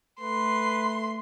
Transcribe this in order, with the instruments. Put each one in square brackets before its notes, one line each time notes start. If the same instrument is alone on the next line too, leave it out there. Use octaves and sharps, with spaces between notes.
[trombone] A3 [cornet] B4 [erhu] C6